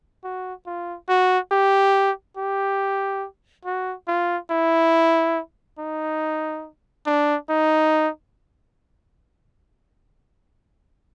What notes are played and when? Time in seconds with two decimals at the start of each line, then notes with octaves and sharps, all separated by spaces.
0.24 F#4
0.66 F4
1.09 F#4
1.52 G4
2.37 G4
3.65 F#4
4.08 F4
4.51 E4
5.79 D#4
7.06 D4
7.50 D#4